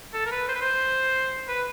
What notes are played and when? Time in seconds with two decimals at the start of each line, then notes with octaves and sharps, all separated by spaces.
0.14 A4
0.26 A#4
0.32 B4
0.49 C5
0.55 B4
0.61 C5
1.48 B4